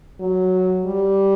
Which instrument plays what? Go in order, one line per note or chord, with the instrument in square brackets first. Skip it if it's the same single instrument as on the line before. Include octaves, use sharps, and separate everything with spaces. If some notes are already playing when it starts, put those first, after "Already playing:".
[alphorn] F#3
G3